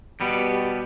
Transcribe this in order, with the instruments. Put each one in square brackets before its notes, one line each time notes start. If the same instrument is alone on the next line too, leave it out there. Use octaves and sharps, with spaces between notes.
[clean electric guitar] B2 G3 B3 [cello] G4